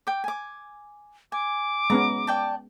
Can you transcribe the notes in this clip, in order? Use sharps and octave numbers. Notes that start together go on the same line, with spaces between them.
G5 D6
G#5 D6
G#5 D6
G#3 B3 C#4 A#5
D5 G5 A5